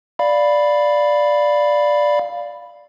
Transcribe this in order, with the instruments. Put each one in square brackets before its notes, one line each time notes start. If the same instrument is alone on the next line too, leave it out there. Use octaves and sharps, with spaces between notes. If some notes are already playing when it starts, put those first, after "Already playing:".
[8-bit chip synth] D5 F5 B5